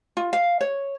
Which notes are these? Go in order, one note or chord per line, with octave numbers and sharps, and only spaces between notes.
F4
F5
C#5